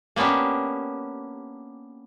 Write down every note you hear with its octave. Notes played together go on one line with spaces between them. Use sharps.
A#3 B3 C#4 D4 G4